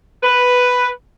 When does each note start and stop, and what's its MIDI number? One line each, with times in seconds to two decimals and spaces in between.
0.22 0.89 71